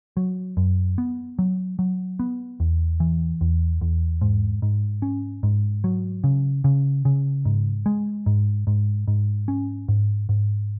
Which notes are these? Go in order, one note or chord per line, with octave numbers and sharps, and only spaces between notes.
F#3
F#2
B3
F#3
F#3
B3
E2
E3
E2
E2
G#2
G#2
C#4
G#2
F#3
C#3
C#3
C#3
G#2
G#3
G#2
G#2
G#2
C#4
G#2
G#2